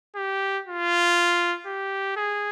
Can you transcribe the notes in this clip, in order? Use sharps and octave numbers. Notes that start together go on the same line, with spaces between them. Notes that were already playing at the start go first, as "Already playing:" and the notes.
G4
F4
G4
G#4